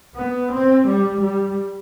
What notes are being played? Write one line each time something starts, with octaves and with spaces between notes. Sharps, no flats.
B3
C4
G3
G3